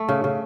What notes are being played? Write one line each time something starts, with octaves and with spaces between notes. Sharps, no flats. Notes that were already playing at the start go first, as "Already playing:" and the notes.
Already playing: A3
C#3
C#3